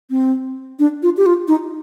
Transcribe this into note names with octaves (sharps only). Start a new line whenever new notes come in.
C4
D4
F4
G4
F4
D#4